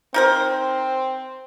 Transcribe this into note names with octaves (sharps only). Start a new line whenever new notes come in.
C4 D#4 A#4 C5